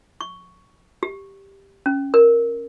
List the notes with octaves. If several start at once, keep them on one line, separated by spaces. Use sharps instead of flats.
C#6
G4
C#4
A#4